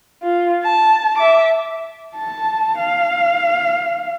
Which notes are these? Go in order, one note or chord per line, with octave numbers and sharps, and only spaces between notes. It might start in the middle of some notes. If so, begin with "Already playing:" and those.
F4
A5
E5 D6
A5
F5